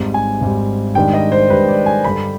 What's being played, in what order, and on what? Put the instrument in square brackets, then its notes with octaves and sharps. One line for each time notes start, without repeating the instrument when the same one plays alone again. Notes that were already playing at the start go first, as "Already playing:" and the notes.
Already playing: [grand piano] G#1 G#2 G3
G#5
G#1 G#2 G3
G#2 D#3 G3 D4 G5
D#5
C5
G#2 D#3 G3 D4 B4
D5
G#5
G2 D3 G3 B5